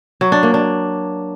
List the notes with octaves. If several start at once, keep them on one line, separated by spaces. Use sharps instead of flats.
F#3
D4
A#3
D4